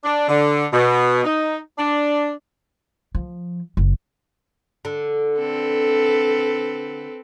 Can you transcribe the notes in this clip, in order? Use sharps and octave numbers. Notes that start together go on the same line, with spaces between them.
D4
D3
B2
D#4
D4
F3
F#1
D3
C4 A4 B4